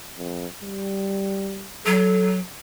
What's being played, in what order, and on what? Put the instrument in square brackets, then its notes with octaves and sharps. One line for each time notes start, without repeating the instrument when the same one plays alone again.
[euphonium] F2
G3
[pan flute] F#3 [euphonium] A4